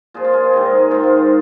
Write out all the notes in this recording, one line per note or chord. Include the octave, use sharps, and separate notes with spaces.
A#2 F3 G#4
F4
G#4
A#4
G#2 D#3 G#4
A#4
G#4
G#2 D#3 F4
F4
G#4